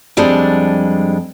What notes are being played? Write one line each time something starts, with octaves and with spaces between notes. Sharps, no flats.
F2 G3 G#3 D4